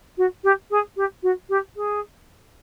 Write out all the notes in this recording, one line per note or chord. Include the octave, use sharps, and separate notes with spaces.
F#4
G4
G#4
G4
F#4
G4
G#4